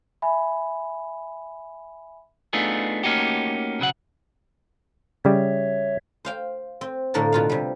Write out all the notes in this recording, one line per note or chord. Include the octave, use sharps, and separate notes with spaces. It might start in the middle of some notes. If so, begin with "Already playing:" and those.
E5 G#5 B5
A3 B3 D4 D#4 F4 G#4
A3 A#3 C#4 D#4 F#4 G4
B1 C#3 F#3 F#5
C#3 G3 C#5 E5
C5 F5 G5
C4
A2 D3 A#3 A5
B2 F4 F5
C3 G3